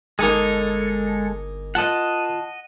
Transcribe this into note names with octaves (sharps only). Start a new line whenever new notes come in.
G1 G#3 A#3 D#4 G#4 A4
F4 D#5 F#5 A5